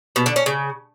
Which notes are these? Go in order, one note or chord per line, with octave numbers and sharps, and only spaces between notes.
B2
D3
C#4
C#3